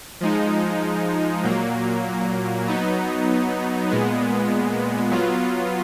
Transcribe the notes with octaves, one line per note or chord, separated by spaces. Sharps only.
F3 G#3 D#4
A#2 F#3 A#3
F#3 B3 D#4
A#2 G#3 B3
F#3 B3 F4